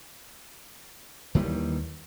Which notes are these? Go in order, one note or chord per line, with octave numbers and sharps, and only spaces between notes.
D#2 D#3 E3 G3